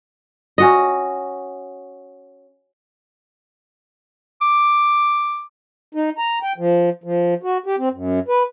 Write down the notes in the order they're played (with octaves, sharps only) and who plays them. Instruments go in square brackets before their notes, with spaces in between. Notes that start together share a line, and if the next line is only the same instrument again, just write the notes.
[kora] C#4 F#4 D#5
[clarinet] D6
[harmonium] D#4
A#5
G5
F3
F3
F#4
G4
C4
F#2
B4